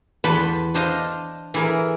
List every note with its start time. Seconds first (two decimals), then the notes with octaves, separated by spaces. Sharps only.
0.24 E2 B4 A5 C6
0.74 D4 C5 D#5 F5
1.54 E3 G#4 A#4